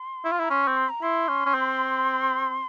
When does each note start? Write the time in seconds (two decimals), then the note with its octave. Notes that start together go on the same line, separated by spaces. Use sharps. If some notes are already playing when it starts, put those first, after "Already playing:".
Already playing: C6
0.25 E4
0.32 F4
0.40 E4 A#5
0.50 C#4 C6
0.64 C4 C#6
0.77 C6
0.89 A#5
1.02 E4 C6
1.28 C#4
1.46 C#4
1.55 C4